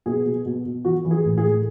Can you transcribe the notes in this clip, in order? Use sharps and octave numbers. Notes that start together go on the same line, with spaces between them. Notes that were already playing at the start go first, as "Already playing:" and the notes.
B2 G#4
B2
B2
B2
E3 F#4
E3
G#4
A2
G#4
A2